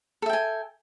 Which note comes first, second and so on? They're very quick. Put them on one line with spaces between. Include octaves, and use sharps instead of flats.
A4 E5 G5 G#5